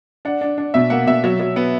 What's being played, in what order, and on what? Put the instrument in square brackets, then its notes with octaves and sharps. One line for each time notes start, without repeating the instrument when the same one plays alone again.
[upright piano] D4 F#5
D4
D4
B2 E5
A#3 F#5
B2 E5
F#3
F#3
B3